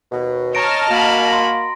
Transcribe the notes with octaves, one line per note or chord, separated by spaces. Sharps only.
D#2 B2
C#5 D#5 A5 A#5 F6 A#6 D7
A#3 F#4 B5
C6 A#6